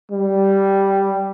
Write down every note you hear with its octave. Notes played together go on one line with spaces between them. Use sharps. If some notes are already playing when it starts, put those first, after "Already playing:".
G3